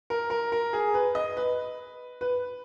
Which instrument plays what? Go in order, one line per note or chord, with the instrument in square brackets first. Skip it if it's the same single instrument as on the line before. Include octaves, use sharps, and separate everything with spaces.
[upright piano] A#4
A#4
A#4
G#4
B4
D#5
B4
B4